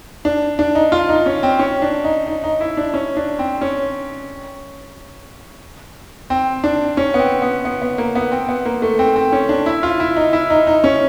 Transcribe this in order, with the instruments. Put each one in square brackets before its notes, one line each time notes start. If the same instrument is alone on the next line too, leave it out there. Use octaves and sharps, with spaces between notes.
[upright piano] D4
D4
D#4
F4
D#4
C#4
C4
C#4
D4
D#4
D#4
D#4
E4
D4
C#4
D4
C4
C#4
C4
D4
C#4
B3
C4
B3
B3
B3
A#3
B3
C4
B3
A#3
A3
C4
C4
C#4
D4
E4
F4
E4
D#4
E4
D#4
D#4
C#4